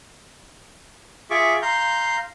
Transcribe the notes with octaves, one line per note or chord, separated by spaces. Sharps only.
F4 G#4 E5 C#6 D6
F5 A#5 C6 G6